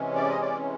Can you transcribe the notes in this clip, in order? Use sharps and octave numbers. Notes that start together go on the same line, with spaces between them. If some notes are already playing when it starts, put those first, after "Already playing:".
Already playing: C3 E3 G#3 C#4
D5
D#5
D5